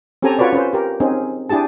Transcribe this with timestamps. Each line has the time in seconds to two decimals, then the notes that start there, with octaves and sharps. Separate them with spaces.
0.22 C4 C#4 G4 A4 G#5 A#5
0.39 F4 F#4 B4 C#5 D5
0.53 C#4 B4 C5
0.73 G4 A#4
1.00 C4 C#4 D#4 G#4
1.49 D4 E4 G4 G#4 A5